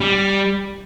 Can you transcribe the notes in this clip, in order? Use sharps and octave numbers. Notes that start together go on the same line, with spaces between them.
G3